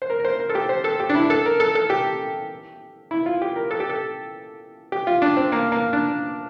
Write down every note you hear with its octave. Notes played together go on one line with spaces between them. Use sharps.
C5
A#4
A#4
C5
A#4
A4
G4
C5
A4
G4
D4
E4
A4
A#4
A4
A4
G4
E4
F4
G4
A#4
A4
G4
A4
G4
F4
D4
C4
A#3
A#3
D4